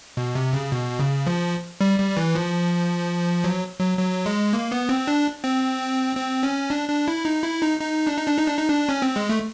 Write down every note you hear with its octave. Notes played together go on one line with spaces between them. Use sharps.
B2
C3
C#3
B2
C#3
F3
G3
G3
E3
F3
F#3
F#3
F#3
G#3
A#3
B3
C4
D4
C4
C4
C#4
D4
D4
E4
D#4
E4
D#4
D#4
D4
D#4
D4
D#4
D4
D#4
D4
C#4
C4
G#3
A3